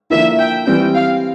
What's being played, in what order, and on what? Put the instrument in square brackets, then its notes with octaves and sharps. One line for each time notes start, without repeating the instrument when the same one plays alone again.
[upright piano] D3 F3 A#3 E4 [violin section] E5
[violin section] G5
[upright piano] E3 G3 C4 [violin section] G5
[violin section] F5